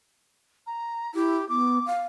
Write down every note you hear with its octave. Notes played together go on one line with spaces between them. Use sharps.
A#5
E4 G4
B3 D6
F5